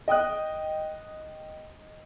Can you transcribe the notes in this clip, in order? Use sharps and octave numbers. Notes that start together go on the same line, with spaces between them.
D#5 G5 D#6 F#6